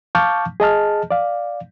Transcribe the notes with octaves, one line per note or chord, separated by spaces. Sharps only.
F5 A5 C#6 D6 F6 G6
G#4 D#5 A5 F6
D5 F5